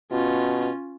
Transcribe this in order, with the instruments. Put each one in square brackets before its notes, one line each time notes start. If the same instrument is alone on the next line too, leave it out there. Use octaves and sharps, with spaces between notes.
[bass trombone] B2 [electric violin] C#4 F4